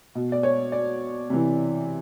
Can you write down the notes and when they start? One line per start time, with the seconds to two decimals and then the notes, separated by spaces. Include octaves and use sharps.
0.15 B2
0.32 D5
0.43 C#5
0.72 D5
1.30 C3 E3